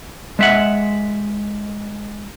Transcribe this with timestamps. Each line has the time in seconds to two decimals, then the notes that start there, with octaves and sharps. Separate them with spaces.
0.39 G#3 E5 F#5